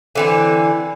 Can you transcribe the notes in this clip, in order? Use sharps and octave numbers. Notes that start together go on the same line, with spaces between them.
D3 E3 C4